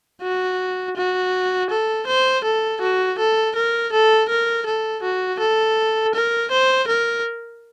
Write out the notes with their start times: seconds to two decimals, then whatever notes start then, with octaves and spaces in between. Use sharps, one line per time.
0.22 F#4
0.97 F#4
1.70 A4
2.07 C5
2.44 A4
2.81 F#4
3.18 A4
3.56 A#4
3.92 A4
4.29 A#4
4.66 A4
5.02 F#4
5.40 A4
6.14 A#4
6.51 C5
6.88 A#4